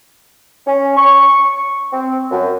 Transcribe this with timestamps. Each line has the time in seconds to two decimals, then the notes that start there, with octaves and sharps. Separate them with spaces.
0.67 C#4
0.97 C#6
1.93 C4
2.31 F#2